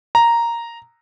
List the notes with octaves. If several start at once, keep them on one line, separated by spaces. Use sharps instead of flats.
A#5